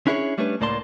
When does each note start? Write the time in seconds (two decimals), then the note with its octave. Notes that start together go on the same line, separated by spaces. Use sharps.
0.07 C#4 D4 E4 G#4 A#4 C#5
0.38 G3 A3 C#4 D4 B4
0.60 C#2 A2 A#3 D5 A5 C6